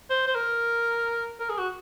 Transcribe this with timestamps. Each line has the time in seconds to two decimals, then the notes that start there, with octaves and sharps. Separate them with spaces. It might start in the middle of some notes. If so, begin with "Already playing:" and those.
0.10 C5
0.27 C5
0.35 A#4
1.40 A#4
1.49 G#4
1.58 F#4